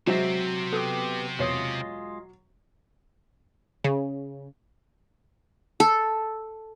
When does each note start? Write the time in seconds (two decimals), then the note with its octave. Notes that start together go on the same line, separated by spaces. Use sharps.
0.07 C3 F#3 G#3 C4 C5 E5
0.73 B3 G4 A4 D#6
1.39 E2 B2 G#3 F4 C#5 D#5
3.84 C#3
5.80 A4